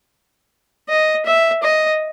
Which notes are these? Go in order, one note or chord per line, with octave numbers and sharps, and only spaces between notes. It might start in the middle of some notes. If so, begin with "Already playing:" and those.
D#5
E5
D#5